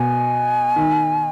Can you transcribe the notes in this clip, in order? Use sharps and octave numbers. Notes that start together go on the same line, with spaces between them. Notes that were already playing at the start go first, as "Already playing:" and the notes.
Already playing: B2 G#5
D#3